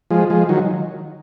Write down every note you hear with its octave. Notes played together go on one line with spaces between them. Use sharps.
F3 G#3
F3 G#3
D#3 F#3